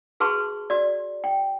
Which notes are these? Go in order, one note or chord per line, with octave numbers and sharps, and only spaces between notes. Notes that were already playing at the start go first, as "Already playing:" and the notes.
F#4 G#4 B4 A5 C6 C#6
F#4 D5
G5